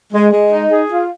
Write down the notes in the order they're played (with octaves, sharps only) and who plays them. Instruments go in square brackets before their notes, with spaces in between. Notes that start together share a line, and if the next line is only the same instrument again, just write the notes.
[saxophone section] G#3
G#3
D#4
G#4
F4